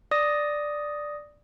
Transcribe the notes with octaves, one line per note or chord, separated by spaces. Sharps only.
D5 D#6 A#6